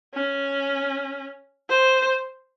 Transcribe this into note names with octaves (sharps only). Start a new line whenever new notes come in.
C#4
C5